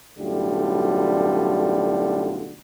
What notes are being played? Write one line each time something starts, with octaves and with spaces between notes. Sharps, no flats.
B1 F#2 A2 D3 G3 F4